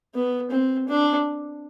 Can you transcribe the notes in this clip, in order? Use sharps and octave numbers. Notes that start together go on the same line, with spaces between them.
B3
C4
D4